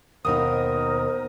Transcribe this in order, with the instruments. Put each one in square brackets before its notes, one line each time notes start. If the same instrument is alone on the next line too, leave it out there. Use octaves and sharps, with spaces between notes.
[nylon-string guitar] D#2 B2 D#4 [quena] A#4 [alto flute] C5 [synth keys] D#6